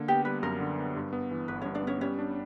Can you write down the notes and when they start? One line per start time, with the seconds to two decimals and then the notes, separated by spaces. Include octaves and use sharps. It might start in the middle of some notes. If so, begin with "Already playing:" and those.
Already playing: D3 A#3
0.08 B3 G4
0.25 G3 B4
0.43 F#2 A#4
0.60 D3
0.79 B3
0.96 G2
1.13 B3
1.31 E3
1.48 G1 B4
1.62 G2 C#4 C#5
1.75 D4 D5
1.83 B3 C#4 C#5
2.01 G3 C#4 C#5
2.19 D4